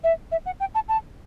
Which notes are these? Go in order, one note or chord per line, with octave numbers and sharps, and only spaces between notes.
E5
E5
F#5
G5
A5
A5